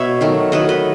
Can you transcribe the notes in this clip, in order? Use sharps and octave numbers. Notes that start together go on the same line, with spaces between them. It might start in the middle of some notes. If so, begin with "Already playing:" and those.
Already playing: B2 C#5 E5
D#3 F#3 A3
D#3 F#3 A3 B4 D#5
B4 D#5